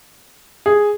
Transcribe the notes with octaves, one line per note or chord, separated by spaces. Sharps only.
G#4